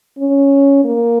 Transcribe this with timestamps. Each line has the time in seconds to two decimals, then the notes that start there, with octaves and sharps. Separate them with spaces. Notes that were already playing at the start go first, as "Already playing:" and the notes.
0.18 C#4
0.85 A#3